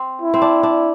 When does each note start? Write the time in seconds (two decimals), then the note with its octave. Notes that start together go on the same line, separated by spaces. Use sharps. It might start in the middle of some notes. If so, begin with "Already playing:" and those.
Already playing: C4
0.22 E4
0.34 C4
0.42 D4
0.63 D4